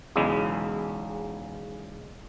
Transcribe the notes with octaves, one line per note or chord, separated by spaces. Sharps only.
B1 E2 C#3 G#3